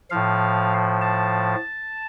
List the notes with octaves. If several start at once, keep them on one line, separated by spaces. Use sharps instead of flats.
A2 F3 F5
A5